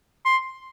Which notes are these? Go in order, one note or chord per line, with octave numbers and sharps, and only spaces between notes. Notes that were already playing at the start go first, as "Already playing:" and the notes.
C6